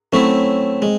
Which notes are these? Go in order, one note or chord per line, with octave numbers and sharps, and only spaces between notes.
F#3 A3 C4 C#4 E4
G#3